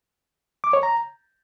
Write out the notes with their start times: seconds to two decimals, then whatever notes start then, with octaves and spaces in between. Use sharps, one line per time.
0.64 D6
0.73 C#5
0.83 A#5